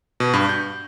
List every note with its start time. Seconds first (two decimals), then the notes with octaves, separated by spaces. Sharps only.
0.20 B2
0.33 G2
0.49 G6